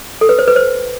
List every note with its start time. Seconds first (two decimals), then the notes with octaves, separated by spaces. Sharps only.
0.21 A4
0.29 B4
0.39 C5
0.48 B4
0.56 C5